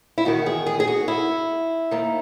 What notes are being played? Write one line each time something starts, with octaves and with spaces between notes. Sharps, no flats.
E4
E2 D#3 F#4
G#4
G#4
G#4
F#4
E4
D#2 D#3